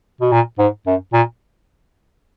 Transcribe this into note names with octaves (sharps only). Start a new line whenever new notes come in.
B2
A#2
G#2
F#2
A#2